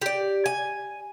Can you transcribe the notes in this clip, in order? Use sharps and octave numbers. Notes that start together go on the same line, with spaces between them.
G4 D5
G#5